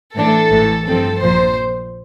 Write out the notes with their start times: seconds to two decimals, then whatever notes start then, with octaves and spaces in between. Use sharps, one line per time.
0.16 A2 E3 A3 D4 A4
0.51 A1 A2 E3
0.86 G2 F3 C4 A4
1.21 A#1 A#2 F3 C5